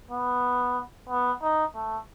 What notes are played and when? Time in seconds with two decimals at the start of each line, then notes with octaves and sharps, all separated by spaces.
0.11 B3
1.09 B3
1.42 D#4
1.75 A3